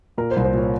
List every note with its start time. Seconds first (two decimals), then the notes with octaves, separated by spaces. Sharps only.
0.18 A#2 A#4
0.31 C5
0.36 C2
0.44 C5
0.54 A#2 C#5